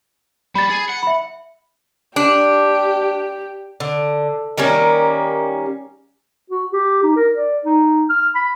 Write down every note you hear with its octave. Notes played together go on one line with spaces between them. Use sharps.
G3 B5 A6
G#4
F#5
E5 B5
D4 G4
D3
D#3 G3 A#3 C#4
F#4
G4
D#4
A#4
D5
D#4
F6
B5